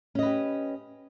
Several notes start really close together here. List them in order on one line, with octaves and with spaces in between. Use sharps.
C#4 D#5 B4 G4